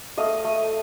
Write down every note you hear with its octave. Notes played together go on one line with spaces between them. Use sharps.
A3 D#5 F5
A3